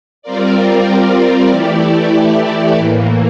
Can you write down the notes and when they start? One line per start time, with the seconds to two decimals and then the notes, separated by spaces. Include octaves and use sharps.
0.22 G3 C4 F4 A#4 D5
1.50 E3 A3 E4 G4 D5
2.77 A2 E3 A#3